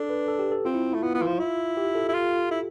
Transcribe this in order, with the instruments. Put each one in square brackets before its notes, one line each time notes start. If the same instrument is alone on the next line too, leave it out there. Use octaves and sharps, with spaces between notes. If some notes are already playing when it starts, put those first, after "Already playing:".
Already playing: [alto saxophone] D4 [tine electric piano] A4
[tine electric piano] B4
A4
G4
A4
[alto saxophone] C4 [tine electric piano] F4
[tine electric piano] E4
[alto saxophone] A3 [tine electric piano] E4
[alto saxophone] B3 [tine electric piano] F4
[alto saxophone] B3
[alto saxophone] E3 [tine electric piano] F4
[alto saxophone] F3
E4
[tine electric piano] G4
A4
[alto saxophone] E4
F4
E4